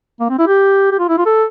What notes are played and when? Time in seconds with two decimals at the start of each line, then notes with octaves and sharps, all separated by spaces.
0.20 A#3
0.30 C4
0.39 E4
0.47 G4
0.92 G4
0.99 F4
1.09 E4
1.18 F4
1.26 A4